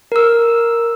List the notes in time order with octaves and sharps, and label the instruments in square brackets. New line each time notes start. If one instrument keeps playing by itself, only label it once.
[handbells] A#4 E6